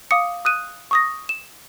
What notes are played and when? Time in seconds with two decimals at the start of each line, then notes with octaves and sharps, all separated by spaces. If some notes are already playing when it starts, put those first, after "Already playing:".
0.11 F5 D6 D#6 C#7
0.45 D#6 F#6 D#7
0.91 C#6 D#6 A#6
1.29 E7